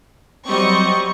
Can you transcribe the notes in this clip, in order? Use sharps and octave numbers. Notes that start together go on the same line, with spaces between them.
F#3 G3 C4 D#5 C#6